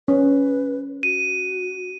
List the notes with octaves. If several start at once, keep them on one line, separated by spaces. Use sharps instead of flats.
C#4 B4
F#4 D#7